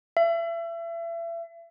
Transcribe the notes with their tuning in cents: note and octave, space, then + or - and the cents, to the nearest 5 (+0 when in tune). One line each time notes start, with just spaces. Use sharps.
E5 +35